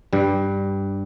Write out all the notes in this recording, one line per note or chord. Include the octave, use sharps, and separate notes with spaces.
G2 G3